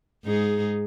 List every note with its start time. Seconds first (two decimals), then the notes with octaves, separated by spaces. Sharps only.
0.24 G#2 D#4 G#4